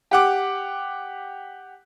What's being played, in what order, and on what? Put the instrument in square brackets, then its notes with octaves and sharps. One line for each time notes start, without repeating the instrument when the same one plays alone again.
[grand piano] G4 F#5 D6